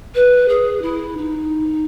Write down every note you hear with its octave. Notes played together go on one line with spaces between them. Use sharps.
B4
G#4
E4
D#4